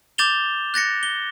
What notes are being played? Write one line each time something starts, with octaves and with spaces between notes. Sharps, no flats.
D6 G6 A6 E7 F7 G7
F#6 A6 A#6 C#7
G7